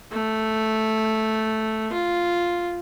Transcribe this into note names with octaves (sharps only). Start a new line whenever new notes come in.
A3
F4